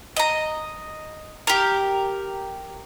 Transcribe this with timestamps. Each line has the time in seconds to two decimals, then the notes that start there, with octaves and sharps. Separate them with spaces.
0.16 D#5 A#5
1.47 G4 A#4